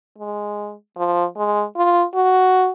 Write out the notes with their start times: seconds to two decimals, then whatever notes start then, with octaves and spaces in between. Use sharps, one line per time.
0.18 G#3
0.97 F3
1.37 G#3
1.76 F4
2.15 F#4